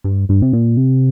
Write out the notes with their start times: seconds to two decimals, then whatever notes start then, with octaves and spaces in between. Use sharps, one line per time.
0.04 G2
0.29 G2
0.42 C3
0.53 A#2
0.77 C3